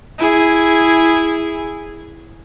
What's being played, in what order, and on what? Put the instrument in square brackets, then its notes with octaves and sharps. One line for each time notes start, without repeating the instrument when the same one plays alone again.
[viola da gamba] E4 G#4